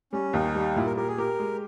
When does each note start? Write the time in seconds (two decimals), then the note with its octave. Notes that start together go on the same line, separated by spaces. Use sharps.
0.13 G3 C#4
0.33 D#2 D#4
0.55 G3
0.76 A#2 E4
0.86 A#4
0.97 G4 A#4
1.08 G#4
1.18 G4 A#4
1.39 G#3